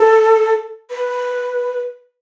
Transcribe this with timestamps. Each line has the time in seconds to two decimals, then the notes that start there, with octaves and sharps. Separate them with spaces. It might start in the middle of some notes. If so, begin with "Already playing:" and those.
Already playing: A4
0.90 B4